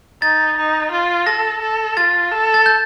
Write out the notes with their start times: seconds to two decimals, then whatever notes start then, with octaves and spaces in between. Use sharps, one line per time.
0.22 D#4 A6
0.57 D#4
0.92 F4
1.27 A4 A#6
1.62 A4
1.96 F4 A6
2.32 A4
2.54 A6
2.66 G6